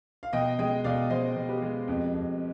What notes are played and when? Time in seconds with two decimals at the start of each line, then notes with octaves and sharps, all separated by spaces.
0.23 F5
0.33 B2 D#5 G5
0.59 G#3 D#5 G5
0.84 B2 D5 F5
1.10 G#3 C5 D#5
1.36 B2
1.49 G4 B4
1.62 G#3
1.88 F2
2.14 F2